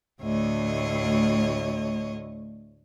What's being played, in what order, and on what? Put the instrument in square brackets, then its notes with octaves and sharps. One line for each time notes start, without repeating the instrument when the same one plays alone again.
[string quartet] D2 A2 C#5 D#5